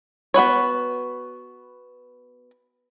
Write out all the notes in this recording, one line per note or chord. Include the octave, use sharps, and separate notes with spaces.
B3 F#4 B4 C#5